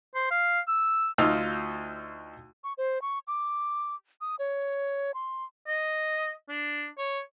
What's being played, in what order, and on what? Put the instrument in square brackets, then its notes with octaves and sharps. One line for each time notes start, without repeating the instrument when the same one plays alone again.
[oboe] C5
F5
E6
[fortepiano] D2 D#4 F4 E6
[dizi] C#6
C5
C#6
D6
D#6
C#5
C6
[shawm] D#5
D4
C#5